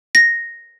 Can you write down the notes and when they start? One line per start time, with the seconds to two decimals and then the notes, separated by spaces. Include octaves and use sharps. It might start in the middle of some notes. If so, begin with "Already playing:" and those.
0.15 A#6